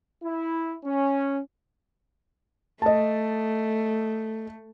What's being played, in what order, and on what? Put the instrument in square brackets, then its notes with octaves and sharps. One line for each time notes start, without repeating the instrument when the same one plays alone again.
[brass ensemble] E4
C#4
[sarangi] A3 [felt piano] D#5 A5